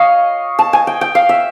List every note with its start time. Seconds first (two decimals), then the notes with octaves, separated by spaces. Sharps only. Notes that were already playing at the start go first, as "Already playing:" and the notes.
Already playing: C#5 D#5 F5
0.59 A5
0.73 G#5
0.87 G5
1.01 G5
1.15 F5
1.29 E5